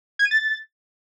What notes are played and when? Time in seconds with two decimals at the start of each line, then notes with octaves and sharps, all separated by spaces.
0.19 G#6
0.25 D#7
0.31 A6